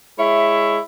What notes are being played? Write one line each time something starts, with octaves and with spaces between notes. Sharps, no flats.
G#3 E4 C#5 E5